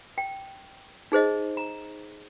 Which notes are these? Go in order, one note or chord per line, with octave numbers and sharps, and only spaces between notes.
G5
D#4 G#4 C5 D#5
A#5